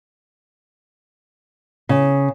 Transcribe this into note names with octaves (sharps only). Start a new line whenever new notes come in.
C#3